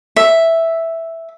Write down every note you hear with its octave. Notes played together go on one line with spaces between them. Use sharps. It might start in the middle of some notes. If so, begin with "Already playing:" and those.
E5